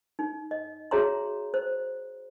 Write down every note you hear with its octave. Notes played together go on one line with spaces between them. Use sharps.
D#4
D#5
F#4 G#4 C#5 E5 A#5 C6
C5